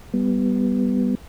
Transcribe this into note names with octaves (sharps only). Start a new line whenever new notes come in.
G3 B3